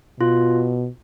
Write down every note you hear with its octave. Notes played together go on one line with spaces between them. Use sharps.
B2 F4